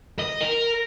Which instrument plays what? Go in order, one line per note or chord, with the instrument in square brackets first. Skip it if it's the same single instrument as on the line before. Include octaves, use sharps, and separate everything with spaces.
[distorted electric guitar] D#5
A#4